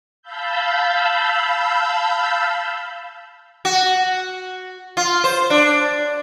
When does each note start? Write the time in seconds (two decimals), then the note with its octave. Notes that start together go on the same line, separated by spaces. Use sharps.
0.22 F5 A5 B5 E6 G6
3.65 F#4
4.97 F4
5.24 C5
5.50 D4